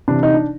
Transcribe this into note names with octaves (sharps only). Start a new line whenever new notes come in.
C3 E3 D4
D#4
D4